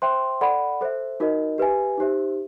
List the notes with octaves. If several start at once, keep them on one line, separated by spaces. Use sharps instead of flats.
C5 E5 G5 C6
A4 D5 F#5 B5
A4 C5 E5
D#4 F#4 A#4 D#5
G4 B4 E5 G#5
D#4 G4 C5 E5